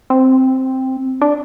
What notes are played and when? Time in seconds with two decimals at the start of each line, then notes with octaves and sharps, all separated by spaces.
0.10 C4
1.21 D4